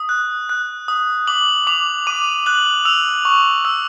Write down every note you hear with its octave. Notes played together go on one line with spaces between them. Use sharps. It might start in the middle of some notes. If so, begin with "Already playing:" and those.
Already playing: D#6
F#6
F#6
D#6
D6 F#7
D6 F7
D6 D#7
F#6 F#7
E6 F7
C#6
E6